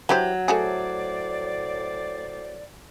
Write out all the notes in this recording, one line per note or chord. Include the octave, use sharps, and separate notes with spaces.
E3 F#3 G4 C5
A2 A3 F#4 G#4 C5 D5